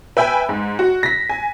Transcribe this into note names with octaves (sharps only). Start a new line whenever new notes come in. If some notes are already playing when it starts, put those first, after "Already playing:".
B4 E5 G5 G#5 B5
G#2
F#4
A#6 B6
G#5